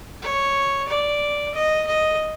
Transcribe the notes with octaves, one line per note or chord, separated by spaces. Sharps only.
C#5
D5
D#5
D#5